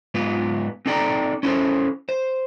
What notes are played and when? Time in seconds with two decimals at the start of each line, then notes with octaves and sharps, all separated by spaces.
0.14 G#2 B3 F4
0.86 C4 D#4 A4 D5 G5 A#5
1.43 C#4 E4 A4 C5
2.09 C5